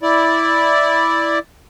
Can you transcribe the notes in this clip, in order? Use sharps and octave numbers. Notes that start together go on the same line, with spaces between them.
E4 D5